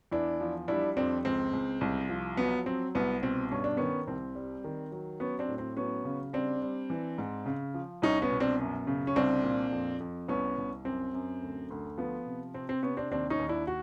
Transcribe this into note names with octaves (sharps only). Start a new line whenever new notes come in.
E2 D4 E4
F3
G3 D4 E4
F2 C4 D4
C#2 C4
C#2
C2
F3
F#3 B3
F#3 C4
C2 B3
B2 C4
G2 C#4
D4
D#3 B3 C#4
C2 C4
G3
D#3
F#3
F#3 B3 C#4
C4 D4
A2
C4
F#3 B3 C#4
C#3
G3 C4 D4
G3
E3
G#2
C#3
F3
C2 C#4 D#4
B3 C#4
B2
C4 D4
F#2
C#3
C#4
C2 C4 D4
A#2
F2
F2
C2 B3 C#4
C2
F#2 C4
F#2
D2
D2
F3 B3
C3
C3 C4
C4
C3 B3 C#4
C4 D4
D#2 C4 D4
C#4 D#4
D#2
D4 E4
F#4